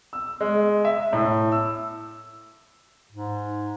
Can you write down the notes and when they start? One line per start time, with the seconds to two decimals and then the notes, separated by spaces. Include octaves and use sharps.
0.13 E6
0.41 G#3
0.85 E5
1.13 A2
1.52 E6
3.12 G#2